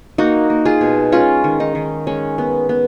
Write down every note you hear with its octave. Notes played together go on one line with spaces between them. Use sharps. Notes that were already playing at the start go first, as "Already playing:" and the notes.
A#3 D#4 F#4
A#3
F4 G#4
B2
G#3 C#4 F4
D#3
D#4
D#3
G#3 C#4
B3
B3